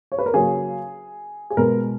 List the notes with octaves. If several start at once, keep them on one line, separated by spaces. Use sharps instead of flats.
C#5
B4
A#4
C#3 F#3 A#3 G#4
G#4
B2 G#3 B3 A#4